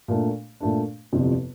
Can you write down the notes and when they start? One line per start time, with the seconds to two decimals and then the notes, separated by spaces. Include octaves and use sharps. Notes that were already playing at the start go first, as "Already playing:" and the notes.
0.08 A#2 A3 D4
0.60 A#2 A3 D4
1.12 G1 F2 C3 E3 G3